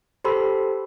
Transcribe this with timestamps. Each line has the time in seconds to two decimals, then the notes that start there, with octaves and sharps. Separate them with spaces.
0.24 G4 A4 C5 B5 C6 E6